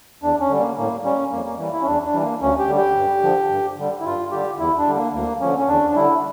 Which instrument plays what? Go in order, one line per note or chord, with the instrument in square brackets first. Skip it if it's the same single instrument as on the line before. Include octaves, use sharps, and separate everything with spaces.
[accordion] E2 D4
C#4
D3 G3
A#3
A2 A#3
G3 C#4
F2 A#3
A#3
E3 G3
E4
C#4
E2 D4
D4
E3 G3
A#3
D2 C#4
G4
D3 G3
G4
G2
D3 F3
G2
D3 G3
E4
G2 F4
D3 G3 G4
E2 E4
D4
D3 G3
A#3
D2 A#3
D3 F3 C#4
C#4
E2 D4
D4
D3 G3 E4